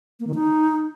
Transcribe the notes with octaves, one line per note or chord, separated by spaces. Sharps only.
A#3
D#3
D#4